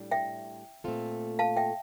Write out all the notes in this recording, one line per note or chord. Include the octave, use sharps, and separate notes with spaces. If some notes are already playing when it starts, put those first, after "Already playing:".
Already playing: A2 G3 D4
E5 G5
A#2 A3 C4 F4 A4
F5 A5
E5 G5